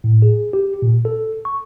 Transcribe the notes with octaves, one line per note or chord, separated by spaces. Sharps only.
A2
G#4
G4
A#2
A4
C#6